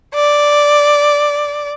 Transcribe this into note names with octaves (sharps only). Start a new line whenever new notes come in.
D5